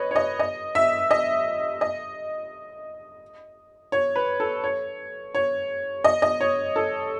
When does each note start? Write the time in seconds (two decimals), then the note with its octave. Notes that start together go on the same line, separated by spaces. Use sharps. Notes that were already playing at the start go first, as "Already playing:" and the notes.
Already playing: B4 C#5 D#5
0.11 C#5
0.16 D#5
0.39 D#5
0.75 E5
1.11 D#5
1.81 D#5
3.92 C#5
4.16 B4
4.40 A4
4.64 C#5
5.34 C#5
6.04 D#5
6.22 D#5
6.41 C#5
6.76 A4